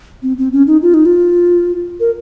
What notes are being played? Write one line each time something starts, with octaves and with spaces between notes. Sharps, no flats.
C4
C4
C#4
D#4
F4
D#4
F4
A#4